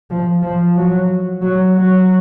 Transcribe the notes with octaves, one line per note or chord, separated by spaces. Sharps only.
F3
F3
F#3
F#3
F#3